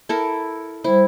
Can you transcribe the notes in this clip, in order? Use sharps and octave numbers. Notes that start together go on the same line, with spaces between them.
E4 A4 A#4
G3 E4 C5